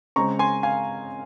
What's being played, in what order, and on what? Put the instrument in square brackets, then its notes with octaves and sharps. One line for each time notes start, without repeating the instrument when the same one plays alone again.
[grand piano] C#3 G#3 C4 A#5 C#6
G#5 C6
F5 G#5